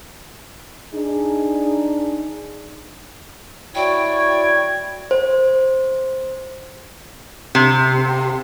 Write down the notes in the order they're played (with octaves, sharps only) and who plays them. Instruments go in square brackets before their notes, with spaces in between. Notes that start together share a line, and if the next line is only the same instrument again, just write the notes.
[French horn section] D4 D#4 G#4
[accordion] E4 C#5 [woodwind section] F#4 D5 [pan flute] G5 [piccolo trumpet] G#6
[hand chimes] C5
[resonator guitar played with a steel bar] C3